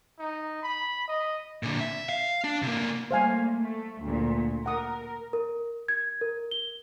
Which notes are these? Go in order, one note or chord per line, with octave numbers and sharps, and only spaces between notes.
D#4
B5
D#5
A#2 D3
E5
F5
D4
C3 A#3
G3 A3 A#3 C5 F5 G#5
A3
D2 A#2
A#4 F#5 D#6
A#4
G#6
A#4
G7